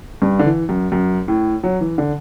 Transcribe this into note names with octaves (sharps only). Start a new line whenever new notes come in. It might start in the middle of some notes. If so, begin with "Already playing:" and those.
G2
D3
E3
F#2
F#2
A2
F#3
E3
D3